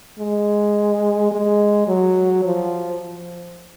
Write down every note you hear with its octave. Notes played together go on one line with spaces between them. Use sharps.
G#3
G#3
F#3
F3